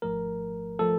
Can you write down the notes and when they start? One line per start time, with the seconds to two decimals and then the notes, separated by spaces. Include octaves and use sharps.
0.02 G#1 G#2 F3 A3 A#4
0.79 F3 A3 A4